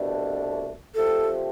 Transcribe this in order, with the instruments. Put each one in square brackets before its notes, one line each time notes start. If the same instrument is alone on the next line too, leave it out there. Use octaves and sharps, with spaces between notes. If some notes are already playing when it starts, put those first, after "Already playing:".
Already playing: [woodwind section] C2 B2 A3 D4
[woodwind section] D3 F3 A3 C4 G4 [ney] A4